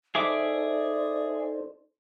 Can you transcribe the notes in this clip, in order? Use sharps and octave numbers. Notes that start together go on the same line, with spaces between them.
D#4 G#4 A4 C5 D5 E5 D6